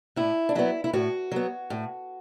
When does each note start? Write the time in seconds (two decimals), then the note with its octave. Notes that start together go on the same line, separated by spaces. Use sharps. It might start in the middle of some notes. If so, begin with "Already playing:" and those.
0.16 A2 E4
0.49 D4
0.55 F#3 B3 E4
0.84 E4
0.93 A2 F#4
1.32 F#3 B3
1.70 A2